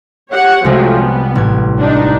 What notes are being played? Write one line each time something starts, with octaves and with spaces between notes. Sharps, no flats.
G4 C#5 F#5
C2 F3 F#3 G#3 A3
B3
A1 G#6
D4 D#4